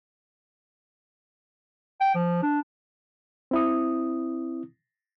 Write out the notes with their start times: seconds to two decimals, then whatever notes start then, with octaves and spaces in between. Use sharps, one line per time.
2.01 G5
2.15 F3
2.43 D4
3.51 C4 E4 D#6